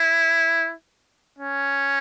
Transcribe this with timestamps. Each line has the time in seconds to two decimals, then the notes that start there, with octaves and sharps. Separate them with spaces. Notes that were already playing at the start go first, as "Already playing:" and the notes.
Already playing: E4
1.39 C#4